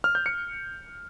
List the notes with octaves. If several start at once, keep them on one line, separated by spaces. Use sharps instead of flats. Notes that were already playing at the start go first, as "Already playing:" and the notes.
F6
G6
C#7